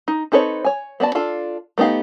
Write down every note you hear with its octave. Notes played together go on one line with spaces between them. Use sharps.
D#4
C4 D#4 A4 B4 C#5
C#5 G#5
B3 F#4 D5 A5
D4 F4 A4
A3 B3 D#4 G4 F5